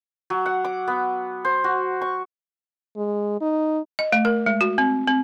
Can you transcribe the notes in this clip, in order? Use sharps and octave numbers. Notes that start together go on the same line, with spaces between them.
F#3
F#5
D6
B3
C5
F#4
C#6
G#3
D#4
D#5
A3
A#4
G#3
F#4
C4
C4